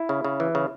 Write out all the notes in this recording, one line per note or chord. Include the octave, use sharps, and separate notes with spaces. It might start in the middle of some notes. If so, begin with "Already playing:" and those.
Already playing: E4
C#3
C#3
E3
C#3